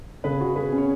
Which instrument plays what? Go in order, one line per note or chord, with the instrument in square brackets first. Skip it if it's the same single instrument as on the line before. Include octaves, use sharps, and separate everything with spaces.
[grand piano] C#3 [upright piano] G#4 B4
[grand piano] F#4
[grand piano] C#3 [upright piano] G#4 B4
[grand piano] C#4
[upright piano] C#5